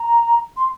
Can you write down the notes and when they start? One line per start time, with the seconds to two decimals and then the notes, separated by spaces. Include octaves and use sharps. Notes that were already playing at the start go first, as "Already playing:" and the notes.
Already playing: A#5
0.56 C6